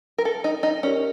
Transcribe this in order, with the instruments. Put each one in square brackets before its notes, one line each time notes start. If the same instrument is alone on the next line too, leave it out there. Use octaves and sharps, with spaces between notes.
[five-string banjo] A#4
A4
D#4
D#4
[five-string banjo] C#4 [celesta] G4 A#4 D5